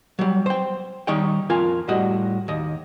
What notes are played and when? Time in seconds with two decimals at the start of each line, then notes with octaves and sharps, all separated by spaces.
0.19 F#3 G3
0.46 C5 G5
1.07 D#3 G3 D#4 C#5 G5
1.50 F2 F4 A#4 G#5
1.88 A2 G3 F#4 D#5
2.48 D#2 D#5